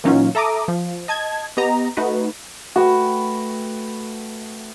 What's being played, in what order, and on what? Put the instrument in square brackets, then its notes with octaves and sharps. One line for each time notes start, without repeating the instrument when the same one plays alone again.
[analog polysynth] A#2 E3 F#3 C#4 D#4 F4
A4 E5 A#5 D6 D#6
F3
D#5 A5 G#6
B3 G4 D#5 A#5
A3 D#4 F#4 B4
[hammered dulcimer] A3 B4 G5 [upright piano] F#4